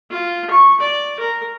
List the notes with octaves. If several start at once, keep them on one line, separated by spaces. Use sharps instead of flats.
F4
C#6
D5
A#4